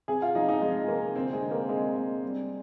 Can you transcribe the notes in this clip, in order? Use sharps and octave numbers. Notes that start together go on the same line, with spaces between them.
C3 G#4
F4
F3 D#4
D#4
F3 G#3
C3 A#3
D3 C4
G#3
D3
A#3
D3 G#3
G#3
G3